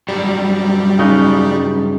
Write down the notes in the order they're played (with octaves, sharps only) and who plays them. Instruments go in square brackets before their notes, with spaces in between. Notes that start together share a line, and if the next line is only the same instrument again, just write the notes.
[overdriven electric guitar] G2 F#3 [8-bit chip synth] G3
[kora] C#3 D#4 B4